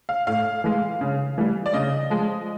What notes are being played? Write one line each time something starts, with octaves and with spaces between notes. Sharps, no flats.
F5
A2 F5
E3 G#3
C#3
E3 G3
D5
C#3 D#5
F3 G#3